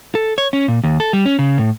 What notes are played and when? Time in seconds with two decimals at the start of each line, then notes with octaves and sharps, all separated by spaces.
0.15 A4
0.38 C#5
0.53 C#4
0.68 A#2
0.84 D#2
1.00 A4
1.13 G3
1.25 C#4
1.39 C#3
1.58 A2